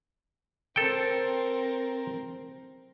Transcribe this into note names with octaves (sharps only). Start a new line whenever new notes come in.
C4 A4 A#4 G5